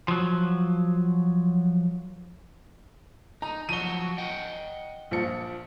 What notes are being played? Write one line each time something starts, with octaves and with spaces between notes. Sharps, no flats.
F3 F#3
D#4 A#5
F3 F#3 F#4 D#7 G7
D#5 F#5 G5
A#1 F3 C#7